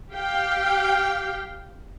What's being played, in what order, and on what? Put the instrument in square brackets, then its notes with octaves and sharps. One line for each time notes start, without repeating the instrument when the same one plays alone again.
[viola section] G4 F5 G5